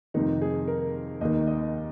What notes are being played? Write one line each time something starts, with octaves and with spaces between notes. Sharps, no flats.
F2 C3 D#3 D#4
G#4
A#4
D#2 D#3 D#5
D#5